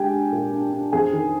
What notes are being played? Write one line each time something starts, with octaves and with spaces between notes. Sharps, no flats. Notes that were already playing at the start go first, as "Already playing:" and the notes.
Already playing: G#3 D4 G4 G5 G#5
D4
A#2
D4
D4
F2 G#4 G#5
D#3